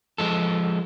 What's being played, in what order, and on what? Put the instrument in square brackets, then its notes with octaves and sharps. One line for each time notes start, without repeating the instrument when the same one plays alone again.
[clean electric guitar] F3 G#3 A4